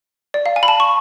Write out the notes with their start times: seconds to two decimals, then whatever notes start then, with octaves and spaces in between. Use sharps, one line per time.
0.34 D5
0.46 F5
0.56 G#5
0.63 B5
0.68 A5
0.80 C#6